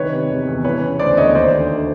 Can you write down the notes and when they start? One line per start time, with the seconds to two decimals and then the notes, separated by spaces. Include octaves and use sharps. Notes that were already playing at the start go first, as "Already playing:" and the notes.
Already playing: C2 D#3 B4 C#5
0.12 C3
0.29 E2
0.47 E2
0.64 E3 B4 C#5
0.82 C#3
0.99 D2 C5 D5
1.17 D2 C#5 D#5
1.35 D#2 C5 D5
1.53 D3
1.71 D3